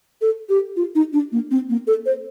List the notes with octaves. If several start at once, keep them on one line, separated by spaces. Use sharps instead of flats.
A4
G4
F4
D#4
D4
A#3
C4
A#3
A4
C5